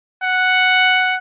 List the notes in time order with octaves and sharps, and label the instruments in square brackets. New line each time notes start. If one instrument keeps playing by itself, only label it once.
[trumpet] F#5